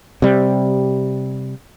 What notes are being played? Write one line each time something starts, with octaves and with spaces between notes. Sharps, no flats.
C3 G3